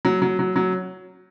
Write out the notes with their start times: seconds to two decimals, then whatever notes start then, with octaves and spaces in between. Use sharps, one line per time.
0.05 F#3
0.22 F#3
0.39 F#3
0.56 F#3